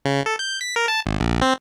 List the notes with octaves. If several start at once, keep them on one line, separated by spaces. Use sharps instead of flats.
C#3
A4
G6
B6
A#4
A5
G#1
A#1
C4